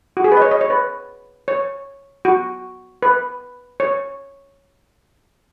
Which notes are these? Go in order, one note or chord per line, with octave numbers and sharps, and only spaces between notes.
F#4
G#4
B4
D#5
C#5
D#5
C#5
B4
C#5
F#4
B4
C#5